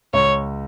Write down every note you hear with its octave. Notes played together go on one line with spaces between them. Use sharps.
C#2 C#5